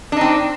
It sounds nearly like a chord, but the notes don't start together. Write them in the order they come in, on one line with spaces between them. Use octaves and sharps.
D4 D#4 C4